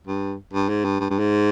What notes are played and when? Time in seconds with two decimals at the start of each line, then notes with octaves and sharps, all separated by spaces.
0.07 G2
0.53 G2
0.69 G#2
0.85 G2
1.00 G2
1.10 G2
1.19 G#2